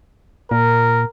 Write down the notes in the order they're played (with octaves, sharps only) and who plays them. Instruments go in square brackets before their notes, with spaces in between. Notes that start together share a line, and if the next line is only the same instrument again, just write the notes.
[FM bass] A#2 [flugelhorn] A#4